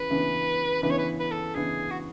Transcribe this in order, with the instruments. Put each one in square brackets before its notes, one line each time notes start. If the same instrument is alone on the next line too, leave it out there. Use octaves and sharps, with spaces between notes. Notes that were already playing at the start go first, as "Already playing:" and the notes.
Already playing: [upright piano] C#3 E3 [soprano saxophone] B4
[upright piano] C#3 E3 B3 D4
[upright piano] C#3 E3 B3 D4 [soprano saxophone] B4
[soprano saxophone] C#5
B4
B4
A4
[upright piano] C#3 E3 B3 D4 [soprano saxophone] G#4
[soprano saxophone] F#4